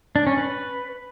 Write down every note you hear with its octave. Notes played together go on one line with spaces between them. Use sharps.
D4
C#4
B4